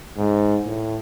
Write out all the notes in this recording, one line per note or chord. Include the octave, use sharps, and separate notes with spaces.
G#2
A2